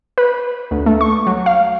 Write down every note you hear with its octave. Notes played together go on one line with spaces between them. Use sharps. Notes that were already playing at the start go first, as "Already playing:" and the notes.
B4
D2
A3
C#6
F#3
F5